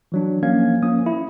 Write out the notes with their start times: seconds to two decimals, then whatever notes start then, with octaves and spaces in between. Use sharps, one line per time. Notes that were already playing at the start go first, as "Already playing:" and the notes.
0.12 E3 F#3 D4
0.43 F3 A#3 C#4 F5 G#6
0.82 F3 A#3 C#4 D#6
1.06 E4